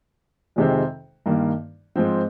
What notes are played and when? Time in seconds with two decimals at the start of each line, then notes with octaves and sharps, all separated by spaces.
0.56 F2 C3 D#3 G#3 C4
1.26 G2 D#3 A#3
1.96 G#2 F3 C4